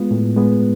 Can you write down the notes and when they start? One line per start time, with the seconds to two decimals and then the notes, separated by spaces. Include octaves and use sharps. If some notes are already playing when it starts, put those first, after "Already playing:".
Already playing: G#3 B3 F4
0.11 A2
0.36 G#3 B3